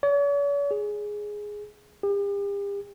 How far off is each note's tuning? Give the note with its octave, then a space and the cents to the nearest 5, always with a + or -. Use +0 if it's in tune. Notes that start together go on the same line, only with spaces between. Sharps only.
C#5 +45
G#4 +0
G4 +40